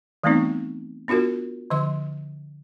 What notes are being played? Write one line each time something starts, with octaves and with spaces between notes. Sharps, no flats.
E3 G3 A3 B3 C4 D#4
B3 D4 F4 F#4 A#4
D3 F3 C6